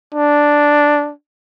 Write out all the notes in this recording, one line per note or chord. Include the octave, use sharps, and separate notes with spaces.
D4